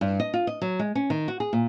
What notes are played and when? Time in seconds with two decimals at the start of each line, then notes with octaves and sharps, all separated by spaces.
0.01 G2
0.20 D#5
0.34 F4
0.47 D#5
0.62 F#3
0.79 G#3
0.95 C#4
1.10 D#3
1.28 F#4
1.40 G#4
1.53 A#2